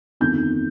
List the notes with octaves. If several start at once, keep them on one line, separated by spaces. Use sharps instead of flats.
G1 F2 D#3 G6